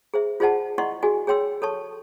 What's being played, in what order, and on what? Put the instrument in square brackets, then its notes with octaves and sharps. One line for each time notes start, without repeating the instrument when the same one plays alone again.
[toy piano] G#4 C5 E5
F4 G#4 C5 D5 F#5 A5
E4 D5 D#5 F#5 C6 C#6
F#4 G#4 D5 G#5
G#4 C#5 G5 C6 E6
A4 C#5 A5 C#6